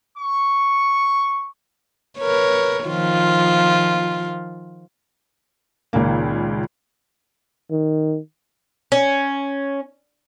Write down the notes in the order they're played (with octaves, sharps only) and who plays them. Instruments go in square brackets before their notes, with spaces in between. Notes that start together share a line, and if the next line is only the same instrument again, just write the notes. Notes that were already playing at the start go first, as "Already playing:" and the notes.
[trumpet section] C#6
[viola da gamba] A#4 B4 C#5
D#3 F3 F4
[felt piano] C#2 A#2 D#3 A#3
[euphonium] D#3
[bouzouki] C#4